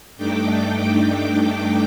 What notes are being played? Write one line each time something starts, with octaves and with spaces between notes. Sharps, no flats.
G2 A3 D4 D#4 G5 D6